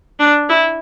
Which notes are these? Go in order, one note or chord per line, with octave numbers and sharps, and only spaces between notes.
D4
E4